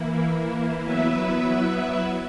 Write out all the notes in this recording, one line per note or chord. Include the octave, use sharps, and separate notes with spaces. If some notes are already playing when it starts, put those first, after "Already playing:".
Already playing: E3 A#3 E4
F#3 B3 E4 B4 E5